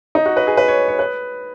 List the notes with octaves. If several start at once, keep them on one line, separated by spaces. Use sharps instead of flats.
D#4
F#4
B4
G#4
B4
C#5
C#5
B4